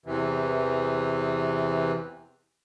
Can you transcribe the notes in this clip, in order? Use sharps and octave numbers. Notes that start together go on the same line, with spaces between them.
E2 C3 E3